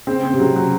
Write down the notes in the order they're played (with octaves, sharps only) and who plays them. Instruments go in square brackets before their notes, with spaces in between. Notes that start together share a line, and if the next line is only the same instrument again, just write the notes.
[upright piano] C#3 [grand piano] C4
[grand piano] C4
[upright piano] C3
[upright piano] C#3 [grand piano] F#3
[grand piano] F#3